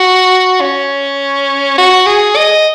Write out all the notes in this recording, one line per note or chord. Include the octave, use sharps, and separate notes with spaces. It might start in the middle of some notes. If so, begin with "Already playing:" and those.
Already playing: F#4
C#4
F#4
G#4
D#5